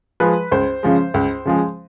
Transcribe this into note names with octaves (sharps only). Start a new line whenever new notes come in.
F3 G#3 B4
C#2 C5
C#3 F3 G#3
C#2
C#3 F3 G#3